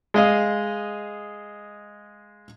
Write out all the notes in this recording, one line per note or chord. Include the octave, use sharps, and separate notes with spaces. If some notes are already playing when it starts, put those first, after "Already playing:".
G#3 D#5 F5